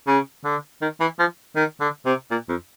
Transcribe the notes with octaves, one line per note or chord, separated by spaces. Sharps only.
C#3
D3
D#3
E3
F3
D#3
D3
C3
A#2
F2